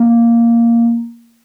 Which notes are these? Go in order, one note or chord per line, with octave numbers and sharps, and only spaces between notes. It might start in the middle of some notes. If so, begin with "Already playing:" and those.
Already playing: A#3